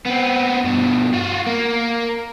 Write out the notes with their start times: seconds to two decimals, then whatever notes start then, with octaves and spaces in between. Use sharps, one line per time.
0.05 B3 C4
0.64 G2 B2
1.13 F4 F#4
1.46 A#3